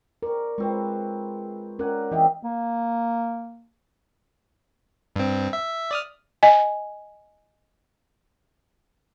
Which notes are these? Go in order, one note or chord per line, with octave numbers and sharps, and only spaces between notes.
A#4 D5 C#6
G#3 C4 F4 B4 C#6
C#4 A#4 D5 F#5 G#5
C3 E3 G3 G4 D#5 E5
A#3
G2 C4
E5
D5 D#6 F6
D#5 G#5